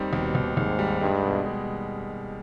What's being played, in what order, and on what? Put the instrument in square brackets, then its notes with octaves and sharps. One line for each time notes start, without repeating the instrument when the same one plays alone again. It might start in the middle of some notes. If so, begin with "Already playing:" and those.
Already playing: [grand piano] D#2 D#3 G3 C4
[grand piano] D#2 [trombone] B2
[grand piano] D#2
[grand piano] D#2 [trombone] G#2
[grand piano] G3
[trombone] G2 [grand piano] G#3
[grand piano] B2
G#3